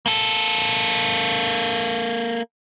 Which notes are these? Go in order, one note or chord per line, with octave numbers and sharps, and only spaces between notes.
A#3 A4